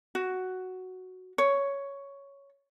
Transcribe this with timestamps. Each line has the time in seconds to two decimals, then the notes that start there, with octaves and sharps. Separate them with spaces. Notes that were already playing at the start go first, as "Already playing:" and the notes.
0.15 F#4
1.38 C#5